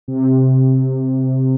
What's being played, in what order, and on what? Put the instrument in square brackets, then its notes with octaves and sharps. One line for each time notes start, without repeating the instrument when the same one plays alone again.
[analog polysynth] C3